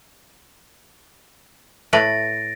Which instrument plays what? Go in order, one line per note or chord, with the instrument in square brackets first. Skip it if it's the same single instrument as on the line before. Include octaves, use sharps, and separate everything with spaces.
[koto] A2 A3 B4 [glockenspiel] A6 A#6 D7